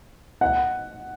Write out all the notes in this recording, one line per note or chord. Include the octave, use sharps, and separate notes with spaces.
F#5